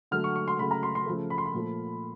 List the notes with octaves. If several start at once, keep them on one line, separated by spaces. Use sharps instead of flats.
D3 F#3 A3 F6
C#6
C#6
C6
C#3 F#3 A3 B5
A#5
C6
C6
C#3 F3 A3
B5
C6
B5
A#2 F3 A3